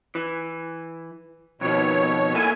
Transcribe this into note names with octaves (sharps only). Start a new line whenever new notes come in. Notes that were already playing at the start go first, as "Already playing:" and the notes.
E3
F2 B2 D#3 C#5
A#3 E4 A4 G#5